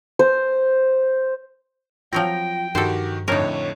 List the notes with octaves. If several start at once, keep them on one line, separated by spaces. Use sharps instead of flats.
C5
F3 F#3 C4 F4 G5 A#6
G2 D#3 F#4 G4 A4 C5
F2 A2 D3 D#4 A#4 C#5